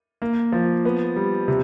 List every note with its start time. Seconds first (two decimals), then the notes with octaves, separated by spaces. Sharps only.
0.22 A#3
0.52 F3
0.85 B3
1.16 G3
1.48 C3